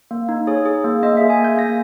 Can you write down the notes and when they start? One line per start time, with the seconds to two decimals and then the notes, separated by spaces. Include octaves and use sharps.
0.11 A#3
0.29 D#4
0.47 G#4 C#5
0.65 G#4
0.84 A#3
1.03 A#3 D#5
1.17 E5
1.21 G#4
1.30 G#5
1.39 A#3 G6
1.57 A#3 A#6